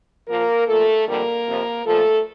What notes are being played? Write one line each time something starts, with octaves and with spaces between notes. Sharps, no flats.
A#2 F3 A#3 A#4
A#2 F3 A3 A4
F2 D3 G3 A#3 A#4
F2 C3 F3
A#2 F3 A3 A4